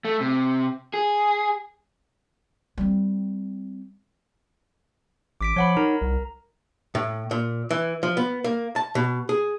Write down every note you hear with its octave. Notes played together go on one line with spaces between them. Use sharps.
A3
C3
G#4
G3 C4
A1 D6 B6 D7
F3 C#5 F#5 B5
D#4 A#4 A#5
C2
A2
A#2
E3
F3
B3
A#3
A5
B2
G#4